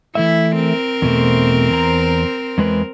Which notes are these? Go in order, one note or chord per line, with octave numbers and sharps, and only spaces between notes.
E3 A3 E4 E5
C4 A#4 C5
E2 B2 A3
E2 A#5
E2 G#3 B4